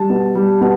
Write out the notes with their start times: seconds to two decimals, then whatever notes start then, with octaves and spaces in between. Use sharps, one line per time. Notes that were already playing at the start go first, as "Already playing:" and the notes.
Already playing: G3 A5
0.10 B2
0.35 G3
0.61 B2